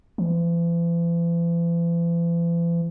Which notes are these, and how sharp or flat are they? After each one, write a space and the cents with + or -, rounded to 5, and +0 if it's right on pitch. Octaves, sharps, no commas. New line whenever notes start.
E3 +45